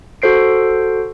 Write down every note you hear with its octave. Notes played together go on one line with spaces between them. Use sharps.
F#4 A4 C5 C7 D7